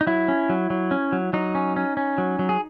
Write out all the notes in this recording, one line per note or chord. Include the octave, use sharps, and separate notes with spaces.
D#4
F#3 E4
C#4
F#3
F#3
C#4
F#3
F#3 D#4
C#4
C#4
C#4
F#3
F#3
G#4